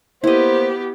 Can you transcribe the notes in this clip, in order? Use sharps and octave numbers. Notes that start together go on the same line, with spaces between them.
A#3 B3 E4 G4 C5 D#5